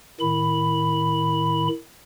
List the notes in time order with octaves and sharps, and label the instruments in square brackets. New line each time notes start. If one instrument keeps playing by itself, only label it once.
[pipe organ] A2 D#3 B5